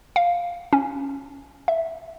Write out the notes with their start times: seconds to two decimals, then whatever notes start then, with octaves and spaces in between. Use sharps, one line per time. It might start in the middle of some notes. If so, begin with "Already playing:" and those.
0.16 F5
0.73 C#4
1.68 E5